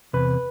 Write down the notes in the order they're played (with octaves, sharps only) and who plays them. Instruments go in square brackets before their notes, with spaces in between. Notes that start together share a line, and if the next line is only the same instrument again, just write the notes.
[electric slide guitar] E2 C3 B4